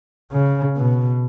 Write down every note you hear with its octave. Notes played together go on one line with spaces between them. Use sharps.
C#3
B2